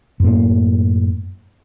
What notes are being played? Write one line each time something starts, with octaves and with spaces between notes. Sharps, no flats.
F#2 A2 A#3